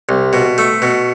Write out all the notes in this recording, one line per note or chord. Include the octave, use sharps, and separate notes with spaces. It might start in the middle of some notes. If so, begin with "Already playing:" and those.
C2
B2
A3
B2